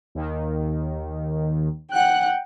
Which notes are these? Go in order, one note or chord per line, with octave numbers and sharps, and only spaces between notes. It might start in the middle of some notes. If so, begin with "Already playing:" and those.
D#2 D#3
F#5 G5 F#6